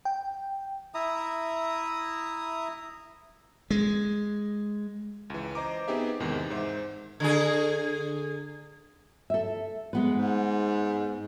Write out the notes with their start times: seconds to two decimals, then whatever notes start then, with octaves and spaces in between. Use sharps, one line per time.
0.05 G5
0.94 E4 E5 A#5 D#6
3.71 G#3
5.30 C#2 E3
5.55 C5 D#5 A#5 D6
5.88 B3 C4 D#4 G4 G#4 E5
6.20 E2 G#2 C3 D#3
6.50 G#2 C5 E5
7.20 D3 G#4
9.30 A4 E5
9.93 G#3 B3 B4
10.10 G#2